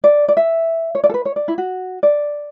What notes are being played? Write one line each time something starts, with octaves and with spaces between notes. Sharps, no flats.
D5
D5
E5
C#5
D5
A4
B4
C#5
D5
E4
F#4
D5